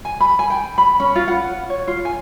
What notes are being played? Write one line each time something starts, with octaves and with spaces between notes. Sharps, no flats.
G#5
B5
G#5
G5
B5
C#4
F4
F#5
C#5
F4
G#5